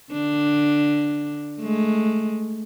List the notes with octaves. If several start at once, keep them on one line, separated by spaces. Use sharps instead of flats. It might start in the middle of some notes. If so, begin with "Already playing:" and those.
D3 D4
G#3 A3